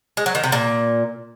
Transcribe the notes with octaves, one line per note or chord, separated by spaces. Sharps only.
G#3
F#3
D#3
C3
A#2